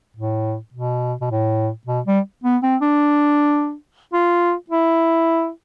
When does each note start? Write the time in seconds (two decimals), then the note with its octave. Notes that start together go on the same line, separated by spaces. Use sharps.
0.17 A2
0.74 B2
1.21 B2
1.30 A2
1.87 B2
2.06 G3
2.44 B3
2.63 C4
2.82 D4
4.13 F4
4.70 E4